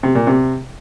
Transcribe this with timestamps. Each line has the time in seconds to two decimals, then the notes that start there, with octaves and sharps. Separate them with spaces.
0.03 C3
0.15 A#2
0.27 C3